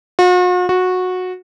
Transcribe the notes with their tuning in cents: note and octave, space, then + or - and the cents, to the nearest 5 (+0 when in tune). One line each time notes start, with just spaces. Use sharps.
F#4 -45
F#4 -15